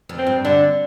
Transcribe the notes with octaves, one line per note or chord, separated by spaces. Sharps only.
F2
C4
G2
D3 D4